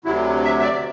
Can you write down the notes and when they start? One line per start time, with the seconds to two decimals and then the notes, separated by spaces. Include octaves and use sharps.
0.05 D2 C3 F#3 E4
0.44 E5
0.60 E5
0.63 D5